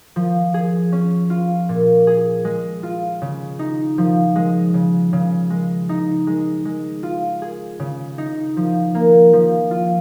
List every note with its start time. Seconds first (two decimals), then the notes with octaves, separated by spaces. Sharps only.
0.16 F3
0.54 G#4
0.92 C#4
1.30 F4
1.69 A#2
2.07 G#4
2.45 G#3
2.83 F4
3.22 C#3
3.59 D#4
3.98 F3
4.36 G#3
4.74 C#3
5.13 C#3
5.50 G#3
5.89 D#4
6.27 G#3
6.65 G#3
7.03 F4
7.42 G#4
7.80 C#3
8.18 D#4
8.57 F3
8.95 A#3
9.33 F3
9.71 F4